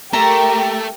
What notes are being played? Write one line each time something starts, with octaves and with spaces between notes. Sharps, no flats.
A3 G4 A#4 A#5